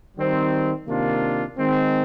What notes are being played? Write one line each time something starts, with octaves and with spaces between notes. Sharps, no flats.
D#3 G3 C4
C3 D#3 A#3 D4 F4
D#3 G#3 C4